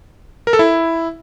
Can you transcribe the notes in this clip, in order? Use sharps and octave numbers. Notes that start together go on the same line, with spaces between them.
A#4
A4
E4